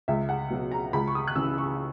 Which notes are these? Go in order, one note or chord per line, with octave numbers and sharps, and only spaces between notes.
C#2 E5
F#5
B2 F#3
A#5
C#2 B5
C#6
D#6
F#6
C#3 E3 E6
C#6